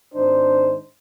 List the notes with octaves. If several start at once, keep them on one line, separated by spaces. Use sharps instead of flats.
G#1 D4 D#4 C5